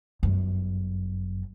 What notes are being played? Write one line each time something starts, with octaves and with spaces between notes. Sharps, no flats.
G1 F#2